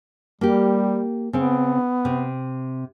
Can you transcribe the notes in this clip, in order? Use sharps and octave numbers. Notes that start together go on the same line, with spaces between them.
G3 A#3 G4
C#3 B3 C4
C3